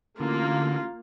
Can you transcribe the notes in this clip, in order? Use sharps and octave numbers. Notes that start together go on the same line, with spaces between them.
A1 D3 A#3 F4